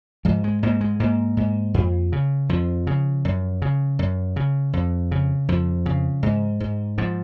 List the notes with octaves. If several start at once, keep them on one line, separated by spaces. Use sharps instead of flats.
G#2 F3
G#3
G#2 A#3
G#3
G#2 A#3
G#2
F2
C#3
F2 F3
C#3
F#2
C#3
F#2
C#3
F2
C#3
F2 F3
C#3
G#2
G#2
G#2 F3